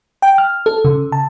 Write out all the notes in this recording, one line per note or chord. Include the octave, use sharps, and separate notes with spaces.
G5
F6
A4
C#3
A5